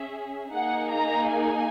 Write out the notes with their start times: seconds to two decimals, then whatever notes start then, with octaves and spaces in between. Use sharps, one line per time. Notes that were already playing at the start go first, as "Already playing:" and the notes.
Already playing: C#4 G#4 E5
0.54 A#3 D#4 G#4 F#5
0.93 A#5
1.32 G#5